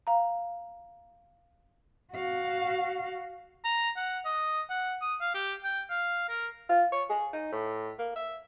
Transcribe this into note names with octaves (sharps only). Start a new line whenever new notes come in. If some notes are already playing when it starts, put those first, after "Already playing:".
F5 A#5
F#4 F5
A#5
F#5
D#5
F#5
D#6
F5
G4
G5
F5
A#4
F4
C#5
G#4
D#4
A2
A#3
E5